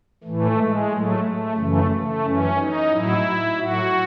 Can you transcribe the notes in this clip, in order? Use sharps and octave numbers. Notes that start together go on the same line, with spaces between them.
A2 E3 A3
G#3
A2 F#3 A3
A3
F#2 C#3 E3 A3
A3
F#2 E3 C#4
D#4
A2 F#3 E4
A2 F#3 F#4